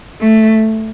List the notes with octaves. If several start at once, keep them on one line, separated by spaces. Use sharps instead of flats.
A3